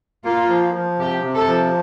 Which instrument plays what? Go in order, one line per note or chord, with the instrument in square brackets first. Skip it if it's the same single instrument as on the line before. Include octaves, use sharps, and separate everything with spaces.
[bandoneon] A#3 [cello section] F4
[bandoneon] F3
F3
[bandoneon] C3 [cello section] G4
[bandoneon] C3
[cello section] A4
[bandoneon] F3